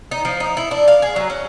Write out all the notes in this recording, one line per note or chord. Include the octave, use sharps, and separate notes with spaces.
D#4
F3
D#4
E4
D4
F5
G#4
F#3
C#4